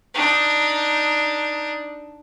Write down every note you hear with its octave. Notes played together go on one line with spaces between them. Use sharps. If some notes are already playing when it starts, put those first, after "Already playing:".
D4 D#4